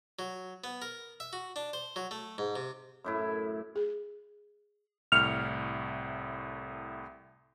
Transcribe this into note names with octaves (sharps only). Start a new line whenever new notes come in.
F#3
B3
A#4
E5
F#4
D4
C5
F#3
A3
G#2
C3
F#2 A2 E4
G#4
C2 A2 F6 C#7